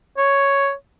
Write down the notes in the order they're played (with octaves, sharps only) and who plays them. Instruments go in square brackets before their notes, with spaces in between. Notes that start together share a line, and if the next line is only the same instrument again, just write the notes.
[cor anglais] C#5